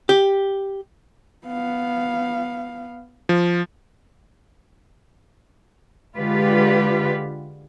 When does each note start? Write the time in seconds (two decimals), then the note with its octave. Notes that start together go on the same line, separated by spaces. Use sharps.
0.09 G4
1.46 B3 F5
3.29 F3
6.17 D3 G#3 F4 G4 B4